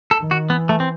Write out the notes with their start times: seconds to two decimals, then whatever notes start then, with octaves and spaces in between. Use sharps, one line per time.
0.11 A4
0.20 D#3
0.31 F#4
0.50 E3 B3
0.69 A3
0.80 C4